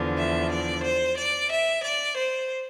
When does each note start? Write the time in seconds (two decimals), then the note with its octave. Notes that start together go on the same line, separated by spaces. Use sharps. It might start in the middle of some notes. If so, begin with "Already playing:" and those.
Already playing: E2 D3 F3
0.18 E5
0.51 D5
0.84 C5
1.17 D5
1.51 E5
1.84 D5
2.17 C5